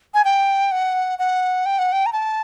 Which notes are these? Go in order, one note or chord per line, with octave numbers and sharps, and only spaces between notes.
G#5
G5
F#5
F#5
G5
F#5
G5
A#5
A5